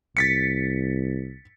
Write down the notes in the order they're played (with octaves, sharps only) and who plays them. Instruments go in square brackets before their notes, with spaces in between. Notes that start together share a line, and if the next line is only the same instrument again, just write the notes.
[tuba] C2 [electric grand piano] A6 B6 C#7